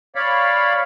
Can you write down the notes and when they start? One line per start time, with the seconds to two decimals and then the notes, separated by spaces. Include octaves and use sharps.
0.15 C#5 D5 F5 B5